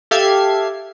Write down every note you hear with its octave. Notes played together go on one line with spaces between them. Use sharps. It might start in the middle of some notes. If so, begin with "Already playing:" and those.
G4 A4 E5 F5 G#6 C7